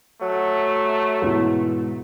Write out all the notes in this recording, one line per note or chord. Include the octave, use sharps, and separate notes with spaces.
F#3 A3
G#2 B2 E3